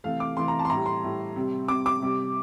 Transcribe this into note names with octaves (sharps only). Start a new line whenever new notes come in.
C3 E3 A3 F5
D6
C3 E3 A3 C6
A#5
A5
C6
A2 G3 A#5
C6
A2 G3
C3 G3
C3 G3 D6
D6
C3 G3